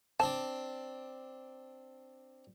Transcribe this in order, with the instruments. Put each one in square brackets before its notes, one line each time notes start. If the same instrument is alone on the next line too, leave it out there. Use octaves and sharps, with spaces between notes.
[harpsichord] C4 D4 [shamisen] A5